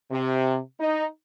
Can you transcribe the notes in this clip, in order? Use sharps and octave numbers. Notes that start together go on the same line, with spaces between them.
C3
D#4